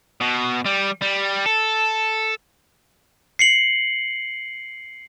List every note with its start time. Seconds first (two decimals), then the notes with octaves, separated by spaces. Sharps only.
0.21 B2
0.66 G3
1.02 G3
1.46 A4
3.39 C7 C#7 F#7